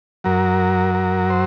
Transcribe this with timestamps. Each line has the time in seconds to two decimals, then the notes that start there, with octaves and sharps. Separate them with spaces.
0.24 F#2 F#3 A#4
0.95 A#4
1.30 C5